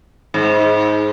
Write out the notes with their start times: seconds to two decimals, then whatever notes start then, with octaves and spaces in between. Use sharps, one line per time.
0.34 G#2